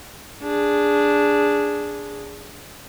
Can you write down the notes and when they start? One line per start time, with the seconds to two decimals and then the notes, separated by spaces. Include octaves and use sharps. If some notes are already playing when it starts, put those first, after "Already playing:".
0.43 D4 G#4